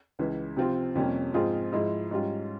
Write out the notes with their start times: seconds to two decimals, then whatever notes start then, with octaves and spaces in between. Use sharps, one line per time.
0.19 C#2 C#3 E3
0.57 C3 F3 C4 F4
0.95 F2 C3 G3 A#3 C#4
1.34 G#2 F3 C4 F4 G#4
1.72 G#2 F3 G#3 E4
2.11 G#2 G3 C#4 F4